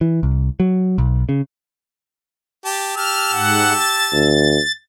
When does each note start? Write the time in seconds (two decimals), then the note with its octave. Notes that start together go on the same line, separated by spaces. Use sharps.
0.01 E3
0.23 C2
0.60 F#3
0.98 B1
1.29 C#3
2.65 G4 A5
2.97 G4 A5 E6 F6
3.32 G#2 F#5
3.78 A6
4.13 D2